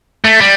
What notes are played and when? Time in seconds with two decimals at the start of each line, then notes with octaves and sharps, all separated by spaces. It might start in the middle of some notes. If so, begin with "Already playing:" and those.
0.25 A3
0.41 G3